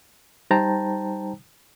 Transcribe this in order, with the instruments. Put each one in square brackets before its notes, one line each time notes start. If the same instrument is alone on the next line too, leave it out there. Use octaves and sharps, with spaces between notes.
[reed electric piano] G3 D#4 C5 G5 A5 A#5